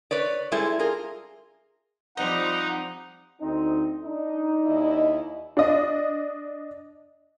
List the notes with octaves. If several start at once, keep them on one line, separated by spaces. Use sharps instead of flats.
B4 C#5 D5
G3 G#3 E4 G#4 A4
F4 G#4 A#4
F3 G3 C4 D#4 D#5 F#5
D2 C4 D#4
D4 D#4
D#2 E4 D#5
D4 D#5